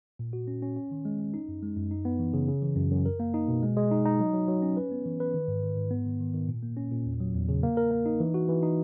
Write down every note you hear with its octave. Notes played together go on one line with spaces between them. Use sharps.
A#2
F#4
C#4
C#4
C#4
D#3
G#3
C#4
D#4
F#2
G#3
F#2
D#4
B3
E3
C#3
C#3
E3
F#2
F#2
A#4
A#3
D#4
B2
G#3
G#3
D#4
D#4
F#3
F#3
F#3
C#4
B4
B3
E3
B4
D#3
G#2
D#3
G#2
B3
D#3
D#3
D#3
A#2
A#3
C#4
A#2
E2
F#3
E2
C#3
A#3
A#4
A#3
D#4
E3
F#4
E3
D#4